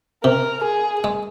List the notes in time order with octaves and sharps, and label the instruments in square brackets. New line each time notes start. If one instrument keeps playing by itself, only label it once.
[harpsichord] C3 [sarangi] A#4
[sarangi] G#4
[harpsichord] G#3